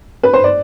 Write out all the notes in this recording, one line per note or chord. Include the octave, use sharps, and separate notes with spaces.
B4
C5
D5